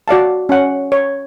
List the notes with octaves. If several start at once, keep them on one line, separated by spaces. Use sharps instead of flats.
F#4 D5 F5 A5
C#4 F#5
C#5